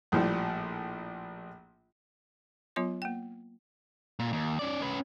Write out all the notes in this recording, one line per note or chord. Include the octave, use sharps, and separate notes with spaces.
A#1 A2 F3 G3
F#3 B3 F4 C#5 C6
A#3 G5
A#2
D#2
C#4 D5
C#4 B4